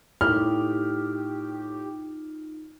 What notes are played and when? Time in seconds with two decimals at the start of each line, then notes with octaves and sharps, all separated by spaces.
0.21 A2 D#4 F4 G4 F6